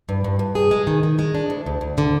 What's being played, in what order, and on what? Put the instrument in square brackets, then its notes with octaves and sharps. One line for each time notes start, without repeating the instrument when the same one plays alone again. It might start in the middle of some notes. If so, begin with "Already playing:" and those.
[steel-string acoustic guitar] G2
G2
G2
G#4
G#3
D#3
D#3
G#3
D4
D2
D2
D2
D3